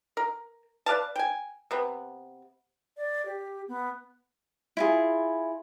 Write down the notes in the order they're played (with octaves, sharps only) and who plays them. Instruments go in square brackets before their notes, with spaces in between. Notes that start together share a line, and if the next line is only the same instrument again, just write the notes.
[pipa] A#4
B4 D5 F5 A5
G5 G#5
C3 B3
[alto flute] D5
G4
B3
[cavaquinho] E4 F4 G#4